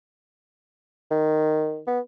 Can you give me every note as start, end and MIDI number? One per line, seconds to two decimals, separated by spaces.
1.11 1.81 51
1.87 2.00 59